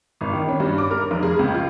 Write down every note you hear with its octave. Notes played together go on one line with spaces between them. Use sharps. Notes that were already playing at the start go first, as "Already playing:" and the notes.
G#1
D#3
C#4
G2
D6
A#4
F1
G#4
C#2
F4